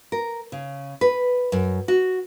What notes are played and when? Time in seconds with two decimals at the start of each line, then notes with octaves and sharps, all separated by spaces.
0.12 A#4
0.52 C#3
1.01 B4
1.52 F#2
1.88 F#4